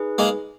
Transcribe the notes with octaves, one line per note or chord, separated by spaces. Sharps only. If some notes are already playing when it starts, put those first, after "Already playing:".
Already playing: D#4 G#4 B4
G#3 A#3